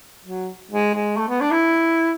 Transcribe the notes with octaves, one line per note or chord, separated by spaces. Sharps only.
F#3
G#3
G#3
A3
B3
D4
E4